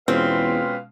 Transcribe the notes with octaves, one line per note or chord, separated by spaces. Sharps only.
E2 B2 G#3 C4 C#4 F4 B4 F5